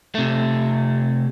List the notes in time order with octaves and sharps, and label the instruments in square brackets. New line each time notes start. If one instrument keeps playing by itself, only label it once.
[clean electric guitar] C3 A3